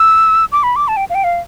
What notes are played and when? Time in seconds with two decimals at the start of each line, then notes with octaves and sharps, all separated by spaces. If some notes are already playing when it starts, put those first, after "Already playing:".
Already playing: E6
0.52 D6
0.63 B5
0.76 D6
0.88 A5
0.97 G5
1.10 F5
1.15 G5
1.24 F5